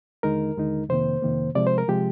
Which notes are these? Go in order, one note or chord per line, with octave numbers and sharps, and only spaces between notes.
D#2 D3 G#3 D#4 A#4
D#2 D3 G#3 D#4
F2 C3 D#3 A#3 C5
F2 C3 D#3 A#3
C3 F3 G#3 D5
C5
A#4
C3 F3 G#3 G4